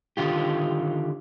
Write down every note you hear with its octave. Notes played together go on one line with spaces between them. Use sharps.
D3 D#3 F4 G4